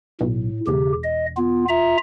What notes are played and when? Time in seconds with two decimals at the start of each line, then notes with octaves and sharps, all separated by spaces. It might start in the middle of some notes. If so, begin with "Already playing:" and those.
0.21 B1 A2
0.67 E1 C#3 G4
1.03 D#5
1.37 B3 F4
1.69 F4 E5 A#5